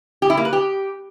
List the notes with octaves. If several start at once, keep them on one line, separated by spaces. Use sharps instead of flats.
G4
E4
A#3
B4
G4